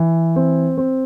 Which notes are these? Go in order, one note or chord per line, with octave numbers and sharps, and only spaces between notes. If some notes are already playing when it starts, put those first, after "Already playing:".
Already playing: E3
C4
C4